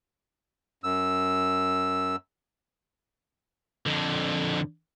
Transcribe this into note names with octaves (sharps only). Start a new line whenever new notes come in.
F#2 E6
F2 D3